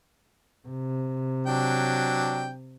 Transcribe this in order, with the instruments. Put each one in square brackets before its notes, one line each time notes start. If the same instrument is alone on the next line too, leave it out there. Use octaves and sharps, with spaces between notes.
[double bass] C3
[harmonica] F#3 D4 G5